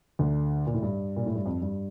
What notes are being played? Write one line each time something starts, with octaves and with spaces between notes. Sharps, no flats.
D2 D3
A#2
A2
G2
A#2
A2
G2
F2
G2